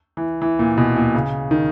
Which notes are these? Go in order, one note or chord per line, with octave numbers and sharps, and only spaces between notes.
E3
E3
A#2
B2
A#2
C#3
D#3